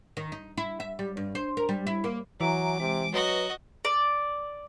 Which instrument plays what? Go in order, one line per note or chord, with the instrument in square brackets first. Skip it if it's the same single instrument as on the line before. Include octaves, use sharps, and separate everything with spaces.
[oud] D#3
D#4
E4
E5
G3
G2
C5
A#4
G3
E4
A#3
[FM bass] E3 [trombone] F#3 [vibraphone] E5 G#5 A#5 [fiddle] D6
[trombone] C3 [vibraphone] G#3
[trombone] F#3 [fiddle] F#4 D#5 [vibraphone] B4
[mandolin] D5